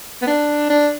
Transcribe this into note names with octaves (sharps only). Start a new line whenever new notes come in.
B3
D4
D4